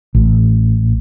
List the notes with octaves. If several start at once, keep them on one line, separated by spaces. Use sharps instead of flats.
A1